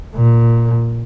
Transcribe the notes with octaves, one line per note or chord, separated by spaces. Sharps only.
A#2